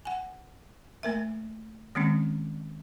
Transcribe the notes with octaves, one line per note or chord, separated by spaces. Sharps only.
F#5 G#5
A3 A#3 A#4 E5
D#3 G#3 A#3 C4 C#4